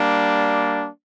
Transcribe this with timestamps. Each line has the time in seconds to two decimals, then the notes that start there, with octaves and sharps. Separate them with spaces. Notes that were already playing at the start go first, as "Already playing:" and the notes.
Already playing: G3 A#3 D4